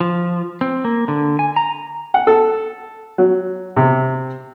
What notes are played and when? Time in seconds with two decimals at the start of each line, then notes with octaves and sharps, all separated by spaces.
0.01 F3
0.61 C4
0.85 A#3
1.08 D3
1.39 G#5
1.56 A#5
2.14 F#5
2.27 A4
3.18 F#3
3.76 C3